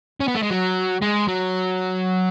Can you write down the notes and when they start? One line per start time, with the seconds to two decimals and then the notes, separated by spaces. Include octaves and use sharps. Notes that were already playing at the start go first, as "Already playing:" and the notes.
0.20 C#4
0.28 B3
0.35 A3
0.42 G#3
0.50 F#3
1.02 G#3
1.28 F#3